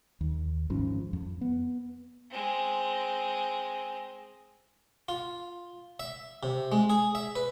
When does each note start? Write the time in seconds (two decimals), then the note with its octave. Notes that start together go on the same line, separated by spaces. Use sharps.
0.21 D#2
0.70 G#1 G#2 F3 C#4
1.13 F2
1.41 B3
2.31 G#3 C4
5.09 F4
6.00 E5
6.43 C3
6.72 G#3
6.90 G#4
7.15 E5
7.36 B4